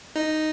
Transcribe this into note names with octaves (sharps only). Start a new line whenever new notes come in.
D#4